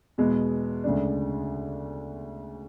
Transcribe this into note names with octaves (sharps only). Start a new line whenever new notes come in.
E2 B2 G#3 B3
D2 C#3 G#3 D4